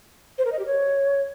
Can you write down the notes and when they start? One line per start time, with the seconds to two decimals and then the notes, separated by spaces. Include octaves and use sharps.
0.38 C5
0.45 A#4
0.52 D#5
0.59 G4
0.66 C#5